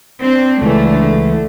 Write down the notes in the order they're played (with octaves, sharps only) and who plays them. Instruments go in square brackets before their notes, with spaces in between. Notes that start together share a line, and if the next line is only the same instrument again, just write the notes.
[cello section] C4 [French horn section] D4
[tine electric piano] C#2 E3 [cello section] D3 A3